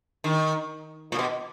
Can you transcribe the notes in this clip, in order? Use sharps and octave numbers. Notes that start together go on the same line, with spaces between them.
D#3
A#2
B2